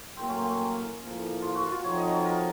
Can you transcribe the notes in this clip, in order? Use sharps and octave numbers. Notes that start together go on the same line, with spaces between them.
A2 F#3 A#3 C4
C#4
C4
C#4
A2 F3 A#3
F4
F#4
F4
F3 A3 C4 D#4 F#4 C#5
D#5
C#5
A#4